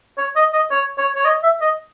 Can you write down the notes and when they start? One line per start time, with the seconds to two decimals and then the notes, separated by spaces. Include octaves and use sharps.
0.18 C#5
0.36 D#5
0.53 D#5
0.71 C#5
0.98 C#5
1.15 C#5
1.25 D#5
1.43 E5
1.61 D#5